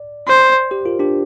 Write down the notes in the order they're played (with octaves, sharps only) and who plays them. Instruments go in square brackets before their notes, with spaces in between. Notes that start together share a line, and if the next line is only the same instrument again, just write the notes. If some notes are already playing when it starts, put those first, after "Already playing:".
Already playing: [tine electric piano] D5
[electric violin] C5
[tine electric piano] G4 C5
F4 A#4
D4 G4